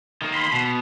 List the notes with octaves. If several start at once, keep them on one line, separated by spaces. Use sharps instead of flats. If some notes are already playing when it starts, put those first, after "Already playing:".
D#3 A#3
B5 C6
B2